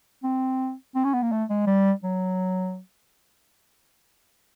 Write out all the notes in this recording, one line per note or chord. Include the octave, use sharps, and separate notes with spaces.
C4
C4
C#4
B3
A#3
A3
G#3
G3
F#3